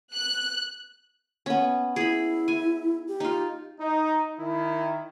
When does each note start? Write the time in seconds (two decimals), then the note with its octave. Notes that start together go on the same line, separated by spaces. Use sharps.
0.13 F#6
1.46 B3 C#4
1.96 E4 G#4 B5
2.48 G#5
3.08 G4
3.20 D#4 F4
3.80 D#4
4.40 D#3 E4